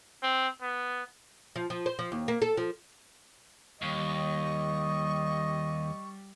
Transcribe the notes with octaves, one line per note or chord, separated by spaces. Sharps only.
C4
B3
F3
F3
C5
F3
D#2
A#3
A4
F3
D#2 G3 D#5 C#6